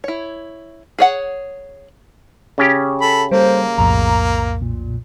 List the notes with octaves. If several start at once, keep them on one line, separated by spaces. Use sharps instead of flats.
E4 C#5
G#4 C#5 F#5
C#3 C#4 G4
A4 B5
G3 A#3 A4 C5
B1 F2 A2 A#5
A#2